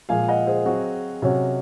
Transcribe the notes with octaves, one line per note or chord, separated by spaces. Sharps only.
A#2 F3 G#3 F5 G#5
D#5 F#5
G#4 C5
F#3 C4 F#4
C3 F#3 C#4 F#4 C#5